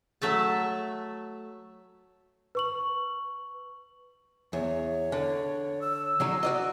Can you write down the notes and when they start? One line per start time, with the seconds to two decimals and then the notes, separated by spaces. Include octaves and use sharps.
0.22 F#3 A3 E5 A5
2.55 B4 C#6 F#7
4.53 E2 C#5
5.12 D3
5.81 E6
6.20 D3 F#3 D#4
6.43 F#4 D5 D#5